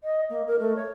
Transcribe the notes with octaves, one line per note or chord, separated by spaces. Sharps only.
D#5
A#3
A#4
A3
C#5